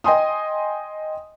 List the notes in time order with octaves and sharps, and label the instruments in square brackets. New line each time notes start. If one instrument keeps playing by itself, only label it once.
[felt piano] D#5 G5 G#5 C6 D#6